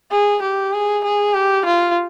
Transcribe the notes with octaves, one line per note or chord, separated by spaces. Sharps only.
G#4
G4
G#4
G#4
G4
F4